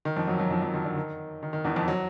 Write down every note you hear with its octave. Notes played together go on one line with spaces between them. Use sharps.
D#3
F2 F3
F#2 F#3
F#2 F#3
F2 F3
F2 F3
D#3
D3
D#3
D#3
D#3
E2 E3
F2 F3
F#3